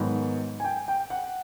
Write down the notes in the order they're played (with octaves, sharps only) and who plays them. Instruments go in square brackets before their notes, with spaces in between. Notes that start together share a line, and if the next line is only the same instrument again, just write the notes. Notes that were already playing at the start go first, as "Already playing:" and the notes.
Already playing: [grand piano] G#2 D#3 F#3 B3
G#5
G5
G5
F#5